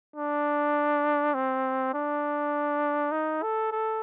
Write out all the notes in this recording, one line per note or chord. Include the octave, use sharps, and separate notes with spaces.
D4
C4
D4
D#4
A4
A4